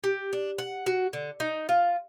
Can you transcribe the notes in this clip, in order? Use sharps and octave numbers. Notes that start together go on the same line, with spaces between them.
G4
D4
F#5
F#4
D3
D#4
F4